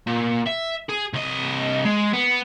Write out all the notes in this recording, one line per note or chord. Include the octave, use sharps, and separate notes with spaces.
A#2
E5
G#4
C2 D#5
G#3
B3